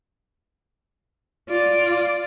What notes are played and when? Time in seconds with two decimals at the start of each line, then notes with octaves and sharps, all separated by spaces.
1.49 F4 D5